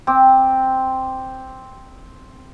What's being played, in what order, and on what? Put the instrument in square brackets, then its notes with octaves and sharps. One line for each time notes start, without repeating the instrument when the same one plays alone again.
[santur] C4 D6